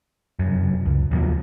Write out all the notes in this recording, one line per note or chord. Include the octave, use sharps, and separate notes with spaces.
F1 F#2
C#2
D#2 B2 F3